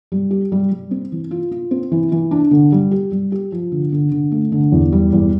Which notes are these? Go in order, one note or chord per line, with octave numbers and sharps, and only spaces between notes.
G3
G4
G3
G3
C4
E3
F4
F4
C4
E3
E3
D4
D3
G3
G4
G3
G4
F3
D3
D3
D3
A3
D3
E2
G3
E2